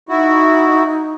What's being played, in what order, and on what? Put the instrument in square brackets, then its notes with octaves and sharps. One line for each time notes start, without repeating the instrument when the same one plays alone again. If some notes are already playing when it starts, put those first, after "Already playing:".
[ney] D#4 [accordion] E4 F#4